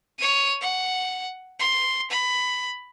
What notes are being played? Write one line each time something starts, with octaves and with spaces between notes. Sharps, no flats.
C#5 D#7
F#5
C6
B5